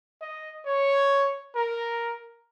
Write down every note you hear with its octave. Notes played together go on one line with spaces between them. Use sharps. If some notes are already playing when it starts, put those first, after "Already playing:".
D#5
C#5
A#4